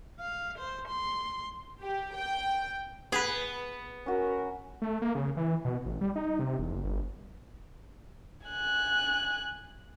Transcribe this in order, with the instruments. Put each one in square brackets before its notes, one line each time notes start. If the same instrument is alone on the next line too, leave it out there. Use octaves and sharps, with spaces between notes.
[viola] F5
C5
C6
[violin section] G4
G5
[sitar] B3 [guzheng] G#4 B4
[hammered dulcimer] C#4 F#4 [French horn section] A#4
[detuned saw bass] A3
A#3
C#3
E3
B2
A1
G3
D#4
C3
E1
F#1
G1
[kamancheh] G#5 F#6